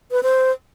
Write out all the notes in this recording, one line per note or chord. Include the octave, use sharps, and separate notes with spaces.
B4
C5